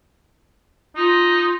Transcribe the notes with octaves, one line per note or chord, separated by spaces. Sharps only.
D#4 F4